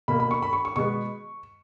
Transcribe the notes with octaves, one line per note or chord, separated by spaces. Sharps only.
B2 A#3 B5
B5
C#6
B5
C#6
C#6
B2 G#3 B3 C#6